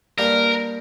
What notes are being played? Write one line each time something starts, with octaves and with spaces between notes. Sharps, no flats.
G2 G3 A#3 A#4